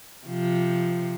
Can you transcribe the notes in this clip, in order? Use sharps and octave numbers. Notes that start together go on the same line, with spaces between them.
C3 F3